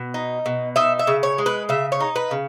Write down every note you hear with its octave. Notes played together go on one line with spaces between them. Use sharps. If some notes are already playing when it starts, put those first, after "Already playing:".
Already playing: B2
D#4
B2
D#4 E5
E5
C#3
C#5
G#3
B4
C#3 E5
C#5
D#4
B4
C#3